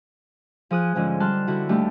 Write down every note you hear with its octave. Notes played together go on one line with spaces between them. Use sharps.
F3 G#4 D#6 F#6
G#2 D3 F3 C#4
G3 A5 C6 F6 F#6
D3 E4 F#4
D#2 G3 A3 D4 G4